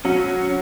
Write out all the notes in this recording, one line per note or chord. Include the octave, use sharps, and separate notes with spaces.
F#3 C#4